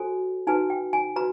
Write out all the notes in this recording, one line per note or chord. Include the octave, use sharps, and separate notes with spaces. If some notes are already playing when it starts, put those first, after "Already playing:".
Already playing: F#4 A4 C5 G#5
D#4 F#4 B4 G#5
G5
G#5
F#4 B4 A#5